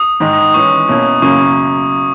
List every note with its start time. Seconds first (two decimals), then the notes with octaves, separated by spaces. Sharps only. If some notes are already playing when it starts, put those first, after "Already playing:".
Already playing: D#6
0.20 G#2 D#3 G#3
0.54 E3 G#3 C#4 C#6
0.88 B2 A#3 C#4 E4
1.22 F#2 C#3 F#3 A#3 C#4 C#6